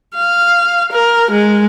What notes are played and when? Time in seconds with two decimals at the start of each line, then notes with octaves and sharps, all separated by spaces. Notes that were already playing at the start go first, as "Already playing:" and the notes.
0.15 F5
0.92 A#4
1.31 G#3